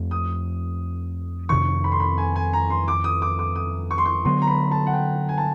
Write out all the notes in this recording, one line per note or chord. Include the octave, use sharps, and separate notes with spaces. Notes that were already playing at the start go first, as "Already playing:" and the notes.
Already playing: F2 F3 A3
D#6
F2 C3 D#3 C#6
B5
C6
B5
G#5
G#5
A#5
C6
D6
D#6
D6
D6
D#6
C#6
C6
C#6
D3 F#3 B3 C6
A#5
B5
A5
F#5
G5
G#5
A5